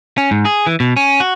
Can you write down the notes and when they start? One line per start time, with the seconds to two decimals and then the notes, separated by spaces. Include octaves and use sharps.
0.18 C#4
0.31 G#2
0.45 G#4
0.67 E3
0.80 B2
0.97 C#4
1.20 F#4